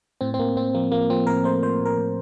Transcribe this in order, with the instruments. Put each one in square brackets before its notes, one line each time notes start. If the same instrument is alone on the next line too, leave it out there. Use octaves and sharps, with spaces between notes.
[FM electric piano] A2 C4
C4
A2 A#3
A2 C4
F3 A#3
F3 A#3
F3 C4
A2 A#4
A3 C5
F3 C5
A2
A#4
A2